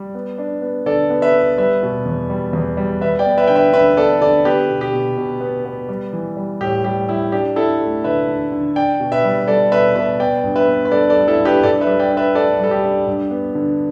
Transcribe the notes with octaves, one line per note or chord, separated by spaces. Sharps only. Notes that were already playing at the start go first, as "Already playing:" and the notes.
Already playing: G3
B3
D4
B3
D3 A4 D5
B3
B4 E5
B3
G3 B4 E5
B2
E2
G3
E2
G3
B3 B4 E5
D5 G5
B3
B4 E5
D3 G5
B4 E5
D3 B4 E5
B3 A4 D5
D3 A4 D5
B3 G4 B4
B2
G4
B2
B2
B3
B3
G3
E3
G3
A2 G4
G3 G4
G3 E4
D4 G4
D4 E4 A4
A3
D3 B4 E5
D3
D3
D4 D5 G5
B2
B4 E5
G3
G3 A4 D5
B2 B4 E5
B2 B4 E5
B3 D5 G5
G2
B4 E5
B3
B4
G2 A4 D5
A4 D5
G3
E4 A4
G2
G4 B4
G2 A4 D5
B4 E5
G3
D5 G5
D4
B4 E5
D4 A4 D5
G3 A4
G4
D4
G2
B3
D3